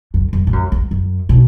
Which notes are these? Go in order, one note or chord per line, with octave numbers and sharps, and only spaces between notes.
F#2
F#2
A2
F#2
E2
F#2
B2